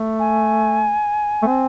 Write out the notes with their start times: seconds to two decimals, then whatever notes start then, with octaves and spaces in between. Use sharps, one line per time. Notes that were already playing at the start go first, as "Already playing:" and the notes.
Already playing: A3
0.19 G#5
1.43 A3
1.47 C4